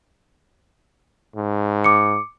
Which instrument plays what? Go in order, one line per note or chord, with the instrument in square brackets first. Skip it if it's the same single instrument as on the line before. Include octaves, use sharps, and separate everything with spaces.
[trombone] G#2
[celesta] D6 C#7